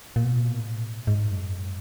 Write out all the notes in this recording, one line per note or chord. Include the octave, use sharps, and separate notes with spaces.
A#2
B2
A#2
A2
G#2
F#2